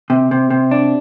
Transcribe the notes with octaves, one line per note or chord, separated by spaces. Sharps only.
C3
C3
C3
D4